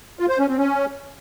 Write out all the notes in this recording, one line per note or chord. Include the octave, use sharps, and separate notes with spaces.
F4
C5
C#4
C4
C#4